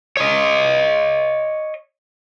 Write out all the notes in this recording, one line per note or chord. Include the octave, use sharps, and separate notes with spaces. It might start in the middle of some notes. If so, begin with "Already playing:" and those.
C#5 D#5